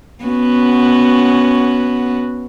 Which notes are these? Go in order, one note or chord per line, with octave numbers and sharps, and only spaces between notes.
B3 C#4 F#4